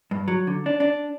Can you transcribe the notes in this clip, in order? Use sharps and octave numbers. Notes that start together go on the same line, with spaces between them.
G2
F#3
D3
D4
D4